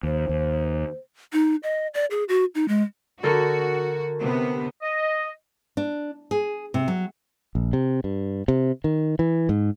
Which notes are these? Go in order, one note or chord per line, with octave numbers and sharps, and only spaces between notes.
D#2 C5
D#2
D#4
D#5
D5
G#4
F#4
D#4
G#3
D3 F#4 A4 A#4
C3 B3
D#5
D4
G#4
C3
F#3
A#1
C3
G2
C3
D#3
E3
G#2